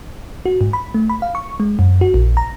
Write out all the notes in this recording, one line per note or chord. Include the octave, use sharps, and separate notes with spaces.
F#4
G#2
B5
A3
B5
F5
C#6
G#3
F#2
F#4
A#1
A#5